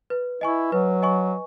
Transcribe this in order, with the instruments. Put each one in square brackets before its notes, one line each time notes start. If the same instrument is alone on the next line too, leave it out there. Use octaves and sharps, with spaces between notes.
[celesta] B4
[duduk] E4 [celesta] D#5 G#5 C#6
[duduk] F#3 [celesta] B4
[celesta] D#5 G#5 C#6